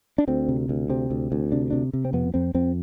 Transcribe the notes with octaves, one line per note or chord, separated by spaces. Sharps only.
D4
D2 C4
C3
D2
C3 C4
D2
D2
C3 D4
C3 D4
C3
C4
F2 B3
F2 C4
F2 C4